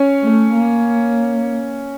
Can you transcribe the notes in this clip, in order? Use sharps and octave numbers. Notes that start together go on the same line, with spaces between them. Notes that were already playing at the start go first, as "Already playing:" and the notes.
Already playing: C#4 C#5
A3
A#3